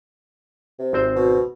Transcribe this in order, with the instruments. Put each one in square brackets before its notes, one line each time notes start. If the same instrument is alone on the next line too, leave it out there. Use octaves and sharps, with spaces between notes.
[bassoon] C3
[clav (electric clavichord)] G#1 C4 C5
[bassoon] B2